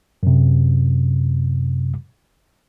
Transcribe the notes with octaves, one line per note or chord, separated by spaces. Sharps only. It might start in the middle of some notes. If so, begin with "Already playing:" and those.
F#2 C3